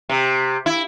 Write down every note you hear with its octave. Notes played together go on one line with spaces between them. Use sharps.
C3
E4